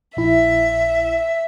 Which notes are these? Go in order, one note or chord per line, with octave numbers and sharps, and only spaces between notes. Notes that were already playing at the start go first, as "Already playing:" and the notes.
A#1 E4 E5